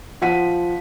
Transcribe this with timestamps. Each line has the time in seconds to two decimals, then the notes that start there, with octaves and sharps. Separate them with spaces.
0.21 F3 F#5 B6 D#7